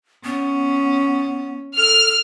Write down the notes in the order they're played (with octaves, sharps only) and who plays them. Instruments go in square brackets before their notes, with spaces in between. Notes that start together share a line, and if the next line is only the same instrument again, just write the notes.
[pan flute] B3 [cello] C#4
[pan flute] A4 [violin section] F6